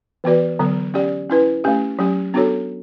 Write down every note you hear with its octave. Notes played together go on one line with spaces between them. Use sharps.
E3 B3 F#4 B4 D5
D3 F#3 B3
C#4 G4 D5
C#4 E4 B4
A3 C#4 G4
F#3 C#4 G4
B3 D4 F#4 A4 C#5